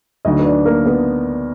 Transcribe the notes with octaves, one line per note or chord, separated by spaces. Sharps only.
D2 D3 F#3 D#4 D#5
B4
D4 D5
A#3 A#4
B3 B4